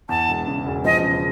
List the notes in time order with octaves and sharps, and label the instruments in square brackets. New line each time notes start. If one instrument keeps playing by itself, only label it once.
[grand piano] E2 [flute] A5
[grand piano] E1
C#3
E1
[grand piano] F3 [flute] D#5
[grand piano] C#3